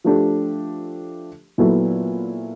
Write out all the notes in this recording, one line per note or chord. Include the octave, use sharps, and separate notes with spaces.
F3 A3 D4 G4
A#2 F#3 B3 E4 A4